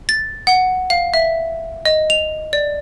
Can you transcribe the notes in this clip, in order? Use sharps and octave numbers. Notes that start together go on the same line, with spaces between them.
A6
F#5
F5
E5
D#5
F7
D5